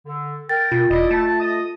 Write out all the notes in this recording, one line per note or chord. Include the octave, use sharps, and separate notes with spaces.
D3
A#4 G5 A6
B2 F4
E1 E4 D5 D#5
A3 A5
D#5 D#6